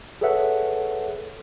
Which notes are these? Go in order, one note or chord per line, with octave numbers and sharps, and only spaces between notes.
G#4 A4 B4 C#5 E5 F#5